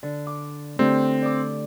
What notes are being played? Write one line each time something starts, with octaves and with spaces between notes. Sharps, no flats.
D3
D6
D3 A3 C4 G4
D5 D6